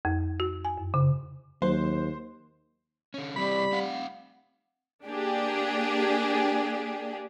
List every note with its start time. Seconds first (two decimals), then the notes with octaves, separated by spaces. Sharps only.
0.05 F2
0.40 F#4
0.65 G#5
0.78 F#2
0.94 C#3
1.62 D#2 F#3 C5
3.14 D3 C#4
3.36 C3 E3 G3 C4 B5
3.72 C4 F5 F#5
5.06 A#3 D4 G4 G#4